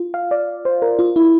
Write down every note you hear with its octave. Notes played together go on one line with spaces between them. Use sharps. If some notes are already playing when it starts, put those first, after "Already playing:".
Already playing: F4
F5
D5
C5
A#4
F4
E4